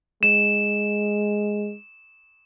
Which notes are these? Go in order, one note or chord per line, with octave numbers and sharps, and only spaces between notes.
G#3 E7